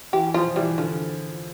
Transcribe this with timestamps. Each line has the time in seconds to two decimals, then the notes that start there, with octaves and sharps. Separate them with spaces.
0.13 E3 G4
0.34 F3 F4
0.56 E3 G3
0.78 D3 F3